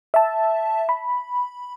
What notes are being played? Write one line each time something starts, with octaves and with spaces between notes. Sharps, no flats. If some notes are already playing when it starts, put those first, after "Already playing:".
E5 A5
B5